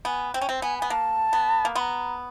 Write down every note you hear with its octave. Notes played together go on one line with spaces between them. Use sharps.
B3 G#5
C4 G5
C#4
C4
B3 G#5
B3 G#5
A#3 A5
B3
A#3
B3 A#5 C6